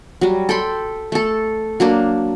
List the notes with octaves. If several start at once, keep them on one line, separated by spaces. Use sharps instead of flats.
F#3 G3
A4 G5 B5 C6
A3 A4
F#3 A#3 D4